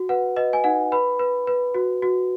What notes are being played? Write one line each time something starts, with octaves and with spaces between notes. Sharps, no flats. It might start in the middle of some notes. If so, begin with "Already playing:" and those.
Already playing: F#4
B4 F#5
B4 D#5
G#5
D#4 F#5
B4 B5
B4
B4
F#4
F#4